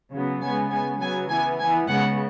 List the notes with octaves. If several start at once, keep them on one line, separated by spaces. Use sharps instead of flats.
C#3 F#3 B3
C#3 G#3 B3 G#5
C#3 G#3 B3 G#5
C#3 F#3 B3 G#5
E3 B3 G#5
E3 B3 G#5
C#3 G#3 B3 F#5